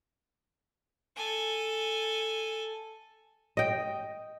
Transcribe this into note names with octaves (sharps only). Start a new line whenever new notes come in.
A4 G#5
D#5 G5